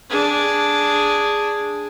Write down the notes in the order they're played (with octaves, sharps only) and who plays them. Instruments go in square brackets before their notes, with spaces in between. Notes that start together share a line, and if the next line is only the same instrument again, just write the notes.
[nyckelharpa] D4 G#4